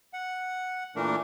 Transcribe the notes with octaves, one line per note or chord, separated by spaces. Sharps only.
F#5
A#2 E3 A3 D4 A#4